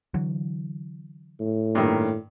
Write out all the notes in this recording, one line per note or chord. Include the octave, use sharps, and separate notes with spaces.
D3 E3 F#3
A2
G2 A#2 D#3